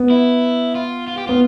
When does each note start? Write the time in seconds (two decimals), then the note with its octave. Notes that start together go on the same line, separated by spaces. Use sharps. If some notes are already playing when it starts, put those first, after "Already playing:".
Already playing: B3
0.10 E4
0.75 F4
1.07 F4
1.18 G4
1.27 B3 F4